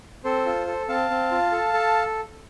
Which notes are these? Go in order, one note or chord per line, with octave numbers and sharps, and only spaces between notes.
C4 A4 C5
F4
A4
C4 F5 A5
C4
F4
A4
A4